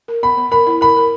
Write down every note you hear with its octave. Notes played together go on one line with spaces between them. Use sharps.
A#4
B3 B5
B3
A#4 B5
E4
A#4 B5
A#4